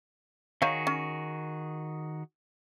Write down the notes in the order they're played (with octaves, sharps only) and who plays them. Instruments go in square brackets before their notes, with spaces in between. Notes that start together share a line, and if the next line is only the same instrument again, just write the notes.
[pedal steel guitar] D#3 F#4 G#4 [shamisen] D#4 C#5 F5
[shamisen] C#4